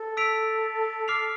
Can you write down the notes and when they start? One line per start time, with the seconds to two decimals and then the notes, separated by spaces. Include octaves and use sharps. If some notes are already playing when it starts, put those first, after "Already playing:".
Already playing: A4
0.17 E6 B6 D7 F7
1.08 D6 F6 C7 F7